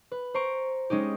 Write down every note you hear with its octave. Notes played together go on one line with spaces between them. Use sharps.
B4
C5 A#5 C#6 D7
G#3 C#4 D#4 G4